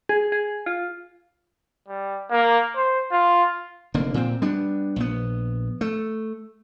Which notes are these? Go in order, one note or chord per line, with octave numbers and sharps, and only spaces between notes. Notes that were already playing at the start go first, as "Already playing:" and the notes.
G#4
G#4
F4
G3
A#3
C5
F4
F1 D3 A#3
A#2 C4
G3 B3 D4
A#1 B3
A3